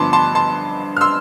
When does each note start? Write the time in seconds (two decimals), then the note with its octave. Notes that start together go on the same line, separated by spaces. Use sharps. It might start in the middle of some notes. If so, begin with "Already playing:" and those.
Already playing: G2 D3 F3 B3 A5 B5 C6 D6
0.13 A5 C6
0.35 A5 C6
0.97 F6
1.01 C6 E6